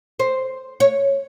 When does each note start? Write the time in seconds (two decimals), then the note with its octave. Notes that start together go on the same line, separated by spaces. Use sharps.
0.19 C5
0.80 C#5